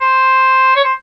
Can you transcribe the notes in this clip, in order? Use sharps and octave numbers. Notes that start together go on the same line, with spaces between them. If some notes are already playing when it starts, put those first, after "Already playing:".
C5
C#5
C5